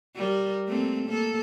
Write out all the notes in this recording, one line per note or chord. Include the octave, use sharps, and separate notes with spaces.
G3 A#4
A3 A#3 C4
A#3 A4